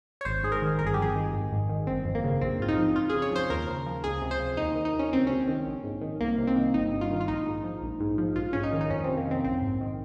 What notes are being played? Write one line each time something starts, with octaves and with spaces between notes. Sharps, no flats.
C#5
G#1 C5
G#2 G#4
A#4
D#3
G1 A#4
G#4
G4
F2 G#4
D#3
G#1
G#2
D#3
G1 C4
F2
A#3
C#3
A#1 C4
G#2 F4
D#4
F3
F2 F4
C#3 G#4
C#5
F3 C5
D#2 A#4
C#3
F3
C#2 G#4
C3
C5
F3
D#2 D#4
D#3
D#4
D#2
C#4
C#2 C4
C3 C#4
D#3
A#1
G#2
D#3
C2 A#3
C3
C4
D#3
G1 D#4
G2
F4
D#3
F4
A#1 D#4
G#2
F3
A#1
G#2
F3
A#1 F4
G#2 C#4
D#4
D#3
D#4
F2 C#4
C3 C4
A#3
D#3 C4
A#1 C4
G#2
D#3